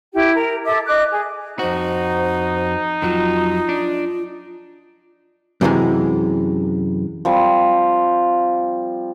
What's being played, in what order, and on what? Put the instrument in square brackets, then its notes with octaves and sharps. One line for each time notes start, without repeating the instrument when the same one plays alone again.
[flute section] E4 G4
A#4
A4 E5 D6
D#5 D6 F#6
G#4
[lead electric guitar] F2 F#4 [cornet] D#4 [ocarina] C5
[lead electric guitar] F2 F#3 [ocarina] F4
[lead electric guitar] D4
[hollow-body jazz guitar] F#2 C3 D#3 E3 G#3
[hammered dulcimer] F3 G3 C4